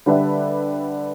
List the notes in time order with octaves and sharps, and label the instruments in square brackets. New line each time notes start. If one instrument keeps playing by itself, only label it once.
[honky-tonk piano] D3 G3 D4 B4 E5